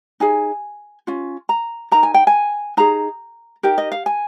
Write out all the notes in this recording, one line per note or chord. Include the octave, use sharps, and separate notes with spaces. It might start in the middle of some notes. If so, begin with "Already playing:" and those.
D#4 G#4 G#5
C#4 F4
A#5
D#4 A#4 A#5
G#5
G5
G#5
D#4 G#4 A#5
D#4 G4 A#4 G5
D#5
F5
G#5